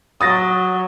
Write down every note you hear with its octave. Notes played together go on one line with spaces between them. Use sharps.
F#3 D#6 A6 A#6